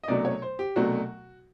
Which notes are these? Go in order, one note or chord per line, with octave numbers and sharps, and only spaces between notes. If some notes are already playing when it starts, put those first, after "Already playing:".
D#5
C2 B2 F#3 A3 D4 D5
C#5
C5
G4
C2 B2 F#3 A3 D4 F#4